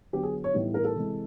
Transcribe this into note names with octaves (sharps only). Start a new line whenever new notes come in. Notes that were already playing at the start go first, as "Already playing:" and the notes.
D3 F#3 B3 G4
G#4
C#5
A2 E3 G3 B3 D#4
A#4
A4
C3 E3 G#3